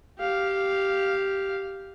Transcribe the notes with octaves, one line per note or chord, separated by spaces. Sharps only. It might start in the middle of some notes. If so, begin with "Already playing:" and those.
G4 F5